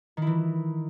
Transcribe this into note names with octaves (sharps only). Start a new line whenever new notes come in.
D#3 E3 E4